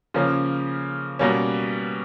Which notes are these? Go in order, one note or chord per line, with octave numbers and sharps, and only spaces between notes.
C#3 F3 A#3 C#4
B2 G3 A#3 C#4